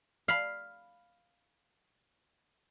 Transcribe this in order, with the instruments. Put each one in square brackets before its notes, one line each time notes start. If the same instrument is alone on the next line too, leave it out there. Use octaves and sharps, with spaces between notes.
[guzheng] F5 B5